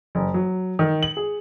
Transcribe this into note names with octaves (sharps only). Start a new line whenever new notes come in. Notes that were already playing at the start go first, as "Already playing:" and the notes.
F#1
F#3
D#3
F#7
G#4